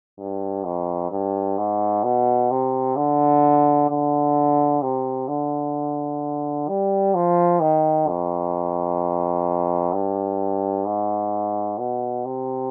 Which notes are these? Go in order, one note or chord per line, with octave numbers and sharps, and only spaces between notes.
G2
F2
G2
G#2
B2
C3
D3
D3
C3
D3
G3
F3
D#3
F2
G2
G#2
B2
C3